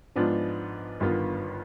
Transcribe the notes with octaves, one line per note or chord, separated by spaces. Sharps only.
G#2 F3 B3 D4 F4
G1 G2 D#3 B3 F4